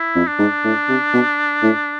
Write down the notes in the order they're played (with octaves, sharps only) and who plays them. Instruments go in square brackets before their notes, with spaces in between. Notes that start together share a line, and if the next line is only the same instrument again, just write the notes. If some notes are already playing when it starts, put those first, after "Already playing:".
Already playing: [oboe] E4
[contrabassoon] F2
[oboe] D4
[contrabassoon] G#2
A2
C3
B2
A2